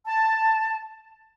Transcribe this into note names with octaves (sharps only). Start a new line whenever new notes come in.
A5